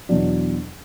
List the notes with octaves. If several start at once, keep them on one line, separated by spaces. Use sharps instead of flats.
E2 B2 F#3 D4